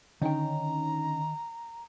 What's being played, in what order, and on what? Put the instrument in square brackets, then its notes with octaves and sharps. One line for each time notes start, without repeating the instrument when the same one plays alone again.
[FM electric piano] D3 C#4 D#4 [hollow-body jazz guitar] D#3 G5 [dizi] A#5